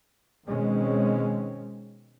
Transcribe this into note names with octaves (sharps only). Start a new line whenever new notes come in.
B2 D#3 G#3 C4 C#4